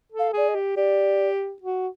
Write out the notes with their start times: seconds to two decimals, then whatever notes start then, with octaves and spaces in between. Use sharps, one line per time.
0.12 A4
0.19 F5
0.33 G#4 D5
0.48 D#5
0.55 G4
0.76 G4 D5
1.62 F#4